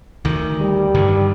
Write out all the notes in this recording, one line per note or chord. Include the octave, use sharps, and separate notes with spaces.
D2 D#3
G3
G2 D3 D#3